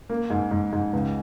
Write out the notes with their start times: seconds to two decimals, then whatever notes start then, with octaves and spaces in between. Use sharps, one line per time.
0.09 A#3
0.30 G#2
0.51 G#2
0.73 G#2
0.93 C#2